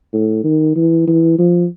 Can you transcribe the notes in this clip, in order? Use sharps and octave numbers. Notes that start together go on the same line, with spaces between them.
A2
D#3
E3
E3
F3